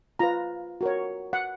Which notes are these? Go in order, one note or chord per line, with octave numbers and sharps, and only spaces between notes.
F4 B4 A#5
F#4 A#4 C#5
F#5